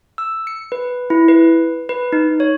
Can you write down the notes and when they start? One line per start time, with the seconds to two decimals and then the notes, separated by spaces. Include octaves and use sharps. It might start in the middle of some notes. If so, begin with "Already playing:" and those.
0.18 E6
0.47 C#7
0.72 B4
1.10 E4
1.28 B4
1.89 B4
2.13 D#4
2.40 C#5